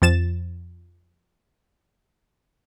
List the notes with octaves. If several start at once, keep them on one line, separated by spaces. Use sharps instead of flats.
F2 F3 A6 E7